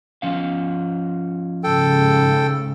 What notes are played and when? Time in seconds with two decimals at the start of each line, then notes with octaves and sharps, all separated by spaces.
0.22 F3 C#4 F5
1.64 G#2 C#3 A4 G5